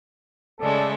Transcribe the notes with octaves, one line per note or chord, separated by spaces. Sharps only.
C#3 G#3 A3 A4 D5